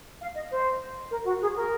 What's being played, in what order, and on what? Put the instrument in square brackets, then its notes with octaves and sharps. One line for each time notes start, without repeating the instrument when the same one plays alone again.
[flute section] F5
D#5
C5
A#4
F#4
G#4
A#4